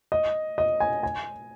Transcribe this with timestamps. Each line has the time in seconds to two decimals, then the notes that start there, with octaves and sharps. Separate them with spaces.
0.12 D#5
0.58 D#5
0.80 G#5
1.03 G#5